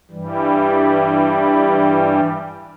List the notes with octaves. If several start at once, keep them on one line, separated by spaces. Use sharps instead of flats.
G2 E3 G3